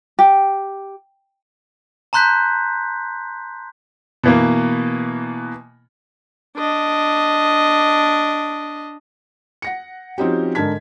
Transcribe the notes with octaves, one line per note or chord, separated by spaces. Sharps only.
G4
A5 A#5 C6 F#6 G6 B6
B2 E3 A#3
D4 D#5
F#5 A#6 C#7
F3 C4 C#4 D#4 F#4 G4
G#2 D3 A#4 A5 G#6 B6